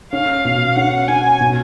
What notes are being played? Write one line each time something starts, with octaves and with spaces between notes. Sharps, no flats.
C#4 F5
B2
C#4 F#5
C#4 G#5
B2